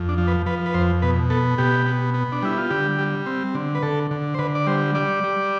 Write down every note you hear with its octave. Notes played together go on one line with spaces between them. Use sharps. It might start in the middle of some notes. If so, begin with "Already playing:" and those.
Already playing: F2
D4
F3
B4
F3 B4
B4
F2 C5
B2 B4
B3 A4
B2 G4
B3
B3
D4
G3 E4
F4
D3 G4
G3
C4
D3
B4
D3 A4
D3
C5
D3 B4
D5
G3 C5
G3 D5
G3